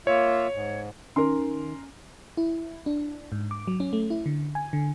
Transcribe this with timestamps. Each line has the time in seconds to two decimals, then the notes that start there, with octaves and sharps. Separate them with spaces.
0.07 A#3 F4 C#5 E5
0.53 G#2
1.16 D#3 C#4 A#4 C6
2.37 E4
2.86 D4
3.32 G#2
3.51 D6
3.68 F#3
3.80 C#4
3.93 A3
4.10 E4
4.26 D3
4.55 G#5
4.73 D3